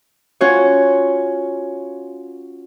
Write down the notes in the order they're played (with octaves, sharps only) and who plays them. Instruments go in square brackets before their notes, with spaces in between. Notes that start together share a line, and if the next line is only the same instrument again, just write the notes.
[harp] C#4 F4 F#4 C#5